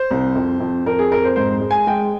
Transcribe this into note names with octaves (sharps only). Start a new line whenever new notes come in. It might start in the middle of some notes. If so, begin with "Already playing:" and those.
Already playing: C5
C2
F2
F2
F2 A#4
G#4
F2 A#4
C5
G#2 C5
G#3
G#5
G#3 G5